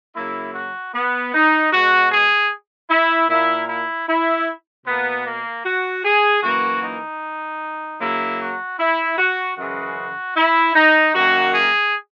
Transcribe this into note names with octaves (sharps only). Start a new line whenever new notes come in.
C#3 F#3 A#3 E4
F#4
B3
D#4
B2 G#3 F#4
G#4
E4
A#2 A#3 E4
E4
E4
B2 A#3 B3
A#3
F#4
G#4
F#2 E3 A#3 F#4
D#4
C#3 F#3 A#3 E4
F#4
E4
F#4
F#2 C#3 E3 G#3 F#4
E4
D#4
F#2 D#3 A#3 F#4
G#4